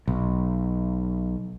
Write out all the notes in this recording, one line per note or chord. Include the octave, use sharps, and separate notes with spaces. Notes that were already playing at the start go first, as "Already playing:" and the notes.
B1